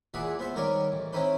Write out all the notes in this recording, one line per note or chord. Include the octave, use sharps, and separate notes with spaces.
E2 A#2 G#4 D5 E5 F#5
B3 C5 E5
D#3 G3 A#4 C#5 D5
A1
C4 C#4 D#4 E4 B4 C5